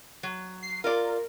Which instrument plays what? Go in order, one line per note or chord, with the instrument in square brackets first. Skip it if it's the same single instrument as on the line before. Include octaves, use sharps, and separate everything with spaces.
[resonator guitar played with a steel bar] F#3
[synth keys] C7
[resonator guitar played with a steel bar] F4 D5 [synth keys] A#4